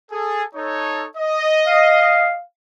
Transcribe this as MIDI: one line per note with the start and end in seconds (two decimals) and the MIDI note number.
0.12 0.43 68
0.12 0.43 69
0.55 1.06 63
0.55 1.06 69
0.55 1.06 73
1.17 2.35 75
1.66 2.41 77